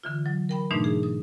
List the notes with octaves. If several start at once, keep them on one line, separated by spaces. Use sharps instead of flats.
D3 E3 F4
F#3
A#4 G5 B5
G#2 B2 E3 A3 D4 D#4
G#4
D#6